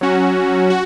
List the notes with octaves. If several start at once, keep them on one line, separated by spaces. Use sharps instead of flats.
F#3 C#4 F#4
F#4